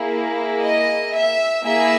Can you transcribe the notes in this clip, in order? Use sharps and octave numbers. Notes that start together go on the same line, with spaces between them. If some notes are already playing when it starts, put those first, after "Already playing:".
Already playing: A#3 E4 G#4
D#5
E5
A#3 E4 G#4 E5